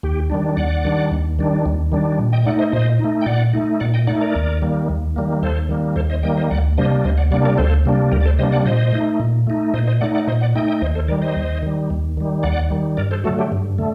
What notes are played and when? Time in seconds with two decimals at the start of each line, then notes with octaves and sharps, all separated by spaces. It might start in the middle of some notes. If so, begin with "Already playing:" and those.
0.03 D#2 G4
0.30 D#3 G3 D4
0.57 D#2 D5 F#5
0.85 D#3 G3 D4
1.11 D#2
1.39 D#3 G3 D4
1.66 D#2
1.92 D#3 G3 D4
2.19 A#2
2.32 D#5 G5
2.45 A3 D#4 D5 F#5
2.59 C5 D#5
2.72 A#2 C5 D#5
2.99 D#4
3.04 A3
3.21 G5
3.26 A#2 D5 F#5
3.53 A3 D#4
3.80 A#2 D5 F#5
3.94 D#5 G5
4.07 A3 D#4 D5 F#5
4.21 A#4 D5
4.35 D#2
4.62 D#3 G3 A#3
4.89 D#2
5.16 D#3 G3 A#3
5.42 D#2 A4 C5
5.69 D#3 G3 A#3
5.96 D#2 A4 C5
6.10 C5 D#5
6.23 D#3 G3 A#3 D#5 G5
6.37 C5 D#5
6.50 D2 D5 F#5
6.78 C3 G3 A#3 D4 C5 D#5
7.04 D2 C5 D#5
7.18 D5 F#5
7.31 C3 G3 A#3 D4 D5 F#5
7.45 A#4 D5
7.58 D2 A4 C5
7.85 C3 G3 A#3 D4
8.12 D2 G4 A#4
8.21 D5
8.25 A4 C5
8.39 C3 G3 A#3 D4 C5 D#5
8.52 D5 F#5
8.66 A#2 C5 D#5
8.93 A3 D#4
9.20 A#2
9.47 A3 D#4
9.74 A#2 C5 D#5
9.87 C5 D#5
10.01 A3 D#4 D5 F#5
10.15 D5 F#5
10.27 A#2 C5 D#5
10.41 D5 F#5
10.55 A3 D#4 D#5 G5
10.68 D#5 G5
10.81 D#2 C5 D#5
10.95 A4 C5
11.08 D#3 A#4 D5
11.11 G3
11.22 C5 D#5
11.36 D#2
11.62 D#3 G3
11.90 D#2
12.17 D#3 G3
12.43 D#2 D5 F#5
12.70 D#3 G3
12.97 G2 A#4 D5
13.11 A4 C5
13.24 D3 F#3 A3 F#4 A4
13.39 G4
13.52 G2
13.78 D3 A3